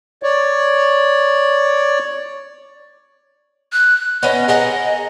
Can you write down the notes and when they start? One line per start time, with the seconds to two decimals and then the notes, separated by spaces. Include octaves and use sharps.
0.23 C#5 D5
3.73 F#6
4.23 B3 C#4 D#5
4.48 G#4 A#4 D#5 F#5